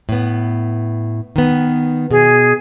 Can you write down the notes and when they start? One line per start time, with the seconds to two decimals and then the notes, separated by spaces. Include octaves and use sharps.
0.09 A2 B3
1.36 D#3 B3
2.11 B2 G#4